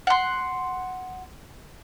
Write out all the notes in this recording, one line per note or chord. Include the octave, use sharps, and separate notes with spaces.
F#5 C6